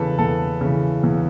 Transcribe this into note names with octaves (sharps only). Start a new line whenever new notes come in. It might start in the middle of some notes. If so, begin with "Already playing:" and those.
Already playing: E2 C#3 E3 A4 B4
E2 A4
C#3 E3
E2